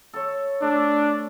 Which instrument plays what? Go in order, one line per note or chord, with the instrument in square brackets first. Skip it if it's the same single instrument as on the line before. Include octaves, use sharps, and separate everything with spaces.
[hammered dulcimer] A4 C#5
[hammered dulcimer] A3 [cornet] D4